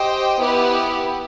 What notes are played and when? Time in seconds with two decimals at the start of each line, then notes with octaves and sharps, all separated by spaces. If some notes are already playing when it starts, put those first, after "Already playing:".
Already playing: G4 C5 D#5 G5
0.38 B3 E4 G4 B4